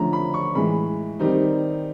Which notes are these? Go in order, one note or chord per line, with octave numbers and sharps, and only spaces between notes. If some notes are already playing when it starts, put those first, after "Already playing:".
Already playing: D3 F3 A3 C#4 A#5
B5
C#6
A2 E3 G#3 B5
D#3 G3 C4 D#4